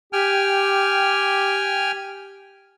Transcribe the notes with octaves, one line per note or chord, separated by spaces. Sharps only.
G4 G5 G#5 F6